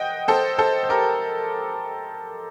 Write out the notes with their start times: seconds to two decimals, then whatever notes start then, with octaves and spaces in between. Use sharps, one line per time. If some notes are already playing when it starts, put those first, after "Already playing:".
Already playing: D#5 F#5 G5
0.28 A4 C5
0.58 A4 C5
0.83 C5
0.89 G4 A#4